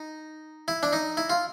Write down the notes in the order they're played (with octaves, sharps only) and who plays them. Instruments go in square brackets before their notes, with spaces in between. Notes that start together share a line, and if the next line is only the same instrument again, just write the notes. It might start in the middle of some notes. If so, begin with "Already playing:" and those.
Already playing: [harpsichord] D#4
E4
D4
D#4
E4
F4